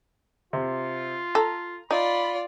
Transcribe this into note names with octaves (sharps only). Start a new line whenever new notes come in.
C3 F4
A4 A#5
D#4 F4 D5 B5